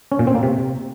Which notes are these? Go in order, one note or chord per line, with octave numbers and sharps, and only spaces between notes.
C#4
A#2
C4
A#3
C3